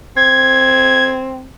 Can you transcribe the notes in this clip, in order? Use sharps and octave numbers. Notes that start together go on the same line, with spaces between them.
C4 G#6